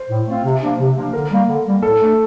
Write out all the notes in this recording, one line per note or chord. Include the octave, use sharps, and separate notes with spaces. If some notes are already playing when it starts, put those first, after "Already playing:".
Already playing: C5
A2
A3 C4 F4
C3
F3 A#3 D4
C3
F3 A#3 D4
D3 A#4
G3 A#3
D3
G3 A#3
A2 A4
A3 D4